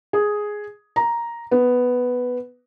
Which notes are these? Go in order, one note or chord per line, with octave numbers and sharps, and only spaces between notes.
G#4
A#5
B3